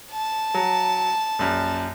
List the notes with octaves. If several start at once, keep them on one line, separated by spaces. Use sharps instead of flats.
A5
F#3
A#1 F#2